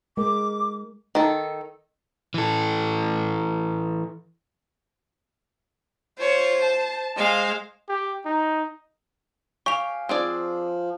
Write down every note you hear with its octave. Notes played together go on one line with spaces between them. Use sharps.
G#3 A#4 D6
D#3 A4
E3 A4
F4 C5 C#5
A5
G#3 C5 F5
G4
D#4
G4 F5 G#5 C#6 F7
F3 C4 G#4 D5